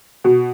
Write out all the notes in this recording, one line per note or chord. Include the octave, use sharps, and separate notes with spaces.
B2